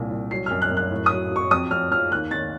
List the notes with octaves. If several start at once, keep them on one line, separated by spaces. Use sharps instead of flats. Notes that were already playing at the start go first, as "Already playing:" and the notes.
Already playing: C2 A#2
C2
F#3 C7
F#2 F6
F#6
F#2
F#6
A2
D#6
F#3
F#3 C#6
F2 D#6
F2 F6
F3 F6
D#2 F#6
D#3 A6